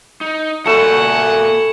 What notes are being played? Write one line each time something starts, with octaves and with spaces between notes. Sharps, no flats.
D#4
A#2 A3 F#4 F#5 G#5 B5 C#7 E7